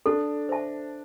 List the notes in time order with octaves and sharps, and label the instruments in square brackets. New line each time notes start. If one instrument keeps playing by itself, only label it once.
[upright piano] D4 [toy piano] A4
[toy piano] C5 E5 A5